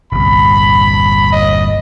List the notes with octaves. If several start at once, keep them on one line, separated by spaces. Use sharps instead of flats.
G1 C2 B5
D#5